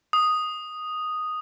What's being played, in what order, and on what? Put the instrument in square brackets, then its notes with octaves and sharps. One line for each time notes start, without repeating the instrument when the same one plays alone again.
[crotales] D#6